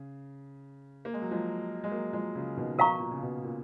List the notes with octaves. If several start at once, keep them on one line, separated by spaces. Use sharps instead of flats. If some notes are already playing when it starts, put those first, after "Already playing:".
Already playing: C#3
A#3
G#3
F#3
F3 G#3
G#3
F#3 A#3
F3 G#3
C#3 F3
B2 D#3
B2 A#4 F5 A#5 C#6
A#2
C#3
B2
A#2